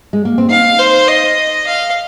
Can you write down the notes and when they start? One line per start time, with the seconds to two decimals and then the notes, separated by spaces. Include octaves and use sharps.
0.13 G#3
0.25 A#3
0.38 C4
0.50 D#4 F5
0.79 C5
1.08 D#5
1.67 F5